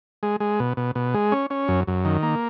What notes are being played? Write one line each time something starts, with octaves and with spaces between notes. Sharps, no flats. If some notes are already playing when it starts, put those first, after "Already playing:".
G#3
G#3
B2
B2
B2
G#3
C#4
C#4
F#2
F#2
D#3
A#3